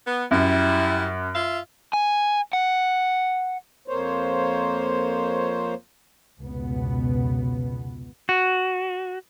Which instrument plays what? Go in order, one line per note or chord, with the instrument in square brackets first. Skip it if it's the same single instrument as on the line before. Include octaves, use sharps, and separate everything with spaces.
[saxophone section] B3
[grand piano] F#2 [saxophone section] G3 E4
[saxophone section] F4 E5 F5
[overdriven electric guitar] G#5
F#5
[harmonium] F2 A#3 C5 C#5
[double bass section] F1 C#2 B2 B3
[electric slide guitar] F#4